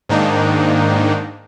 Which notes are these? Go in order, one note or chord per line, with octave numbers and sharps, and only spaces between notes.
G#2 D#3 A#3 D4 D#4